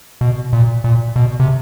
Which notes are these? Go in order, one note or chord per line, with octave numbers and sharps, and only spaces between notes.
B2
A#2
A#2
B2
C3